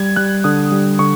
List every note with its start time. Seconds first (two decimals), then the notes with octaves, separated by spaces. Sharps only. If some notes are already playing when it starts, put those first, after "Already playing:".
Already playing: G3 G#6
0.16 G3 F#6
0.44 D3 D#6
0.72 G3
0.99 D3 C#6